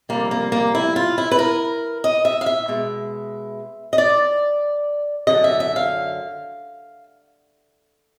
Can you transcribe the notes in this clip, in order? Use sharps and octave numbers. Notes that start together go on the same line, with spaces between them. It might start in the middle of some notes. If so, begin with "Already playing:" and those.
F2 C3 E3 G3 A#3
A#3
A#3
E4
F4
E4
B4
A#4
D#5
E5
F5
E5
B2 G#3
D#5
D5
F#2 D3 F#3 D#5
E5
E5
F5